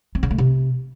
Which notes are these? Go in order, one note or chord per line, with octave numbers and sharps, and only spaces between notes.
C4
C#3
A3
C3